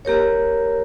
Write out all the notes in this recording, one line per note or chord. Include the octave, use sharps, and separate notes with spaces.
A#3 G4 A#4 C#5